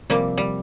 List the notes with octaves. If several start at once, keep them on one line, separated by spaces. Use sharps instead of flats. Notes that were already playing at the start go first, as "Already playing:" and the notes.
C3 F3 G3 A#3 C4
G3